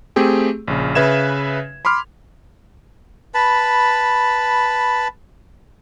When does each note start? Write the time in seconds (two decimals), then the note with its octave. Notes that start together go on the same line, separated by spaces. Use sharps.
0.16 A3 C4 G4 G#4
0.68 A#1 C#3
0.95 C#3 B4 E5 G#6 E7
1.85 B5 C6 D6 F6
3.34 B4 A5 B5